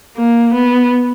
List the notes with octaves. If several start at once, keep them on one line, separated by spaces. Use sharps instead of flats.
A#3
B3